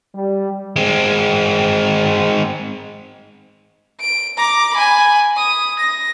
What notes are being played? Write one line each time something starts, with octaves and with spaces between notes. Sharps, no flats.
G3
G#3 C4
D7
A#5 D6
G#5 B5
D#6
A#6